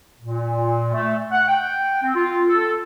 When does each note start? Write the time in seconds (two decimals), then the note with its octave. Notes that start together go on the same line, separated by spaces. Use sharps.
0.20 A#2
0.93 A3
1.31 F#5
1.48 G5
2.03 C4
2.15 F4
2.48 A4